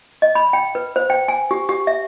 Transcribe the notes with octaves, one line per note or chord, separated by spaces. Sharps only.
D#5
B5
G5
B4
C5
G5
G#5
G4
G4
E5